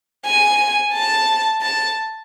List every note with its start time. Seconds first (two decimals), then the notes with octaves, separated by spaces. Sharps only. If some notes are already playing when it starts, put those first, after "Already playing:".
0.25 G#5
0.93 A5
1.62 A5